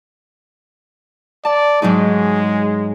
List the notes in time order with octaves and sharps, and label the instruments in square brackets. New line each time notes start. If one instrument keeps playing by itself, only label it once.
[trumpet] D5 [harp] A5
[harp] G#2 F#3 D#4 [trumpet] G#3